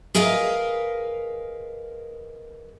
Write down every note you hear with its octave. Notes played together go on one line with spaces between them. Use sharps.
G#4 A#4 B4 D#5 F5